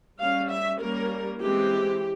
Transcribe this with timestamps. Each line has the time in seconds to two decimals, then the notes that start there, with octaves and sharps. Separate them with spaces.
0.20 G3 C#4 F5
0.50 E5
0.80 G3 A#3 C#4 A#4
1.40 E3 G#3 C4 G4